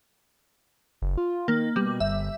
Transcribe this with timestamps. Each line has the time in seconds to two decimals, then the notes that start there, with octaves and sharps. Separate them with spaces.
1.02 F#1
1.17 F4
1.48 D#3 A#3
1.76 B2 G3
2.00 G1 E5